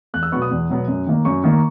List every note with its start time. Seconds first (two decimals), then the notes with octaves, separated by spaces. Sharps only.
0.14 E2 F#6
0.23 E6
0.32 B2 F#3 B3 C#6
0.42 D#6
0.51 E2
0.70 B2 F#3 B3
0.88 F#2
1.07 D#3 A#3
1.25 F#2 C#6
1.44 D#3 A#3